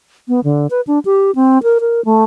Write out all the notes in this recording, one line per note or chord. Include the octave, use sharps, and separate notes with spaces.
B3
D3
B4
D4
G4
C4
A#4
A#4
A3